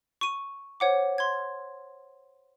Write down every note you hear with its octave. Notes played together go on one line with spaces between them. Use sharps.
C#6 D#7
C5 C#5 F#5 D6
C6 G#6